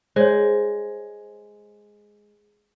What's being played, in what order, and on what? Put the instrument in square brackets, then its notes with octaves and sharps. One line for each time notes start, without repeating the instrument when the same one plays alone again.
[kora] G#3 [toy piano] C5 C#5